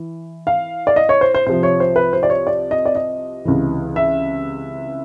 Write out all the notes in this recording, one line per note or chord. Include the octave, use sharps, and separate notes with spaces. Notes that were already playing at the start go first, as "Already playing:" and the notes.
Already playing: E3
F5
D5
D#5
C#5
C5
C5
C2 C3 F3 C5
C#5
C5
B4
C5
D5
C#5
D5
D#5
D5
D#5
C#2 C3 E3
E5